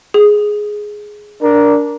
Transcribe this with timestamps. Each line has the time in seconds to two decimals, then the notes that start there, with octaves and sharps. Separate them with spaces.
0.14 G#4
1.41 D4 A#4